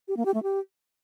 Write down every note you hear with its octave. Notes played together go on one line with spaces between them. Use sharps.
G4
A#3
G4
A3
G4